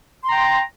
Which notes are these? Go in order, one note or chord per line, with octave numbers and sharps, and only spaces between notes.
G5 A#5 C6